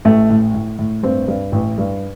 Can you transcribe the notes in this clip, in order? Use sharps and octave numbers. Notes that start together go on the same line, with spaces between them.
A1 A3
A2
A2
A2
G2 C4
G2
A1
G2